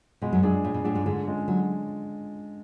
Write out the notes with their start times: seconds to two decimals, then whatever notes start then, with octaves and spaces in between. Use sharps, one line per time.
0.22 B2 G#3
0.33 F#2 F#3
0.43 F#2 F#3 D4 G#4
0.64 A2 G#3
0.74 B2
0.84 A2 A3 D4 G#4
0.95 G#2 G#3
1.05 G#2 D3 G#3
1.28 G#3 C#4
1.48 D3 F#3